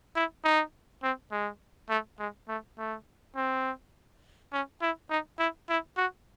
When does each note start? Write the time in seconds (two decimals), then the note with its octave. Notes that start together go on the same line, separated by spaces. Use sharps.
0.16 E4
0.44 D#4
1.03 C4
1.32 G#3
1.89 A3
2.19 G#3
2.48 A3
2.78 A3
3.36 C4
4.53 C#4
4.82 E4
5.10 D#4
5.39 E4
5.69 E4
5.97 F#4